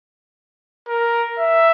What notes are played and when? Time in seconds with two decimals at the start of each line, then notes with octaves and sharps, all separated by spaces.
0.88 A#4
1.39 E5